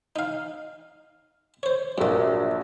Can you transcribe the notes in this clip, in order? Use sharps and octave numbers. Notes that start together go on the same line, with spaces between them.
D#4 F5
C5 C#5
A#1 G2 F#3 A#3